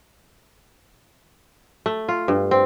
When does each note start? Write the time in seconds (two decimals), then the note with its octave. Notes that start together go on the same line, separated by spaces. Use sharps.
1.86 A3
2.09 F4
2.28 G2
2.51 C4